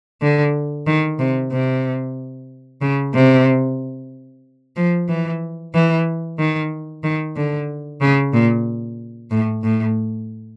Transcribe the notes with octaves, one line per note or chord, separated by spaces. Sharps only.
D3
D#3
C3
C3
C#3
C3
F3
E3
E3
D#3
D#3
D3
C#3
A#2
A2
A2